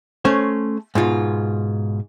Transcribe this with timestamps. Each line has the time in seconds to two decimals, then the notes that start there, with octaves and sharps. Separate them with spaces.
0.25 A3 C#4 C5 C#5
0.95 G#2 B2 F4